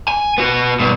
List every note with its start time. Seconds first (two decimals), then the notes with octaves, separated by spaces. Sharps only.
0.08 G#5
0.38 B3 F#4
0.79 G2 B2